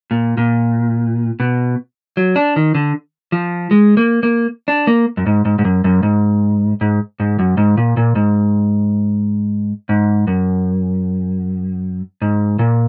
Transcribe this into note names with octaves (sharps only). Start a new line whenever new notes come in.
A#2
A#2
B2
F#3
D4
D#3
D3
F3
G#3
A#3
A#3
D4
A#3
F#2
G#2
G#2
G#2
F#2
F#2
G#2
G#2
G#2
F#2
G#2
A#2
A#2
G#2
G#2
F#2
G#2
A#2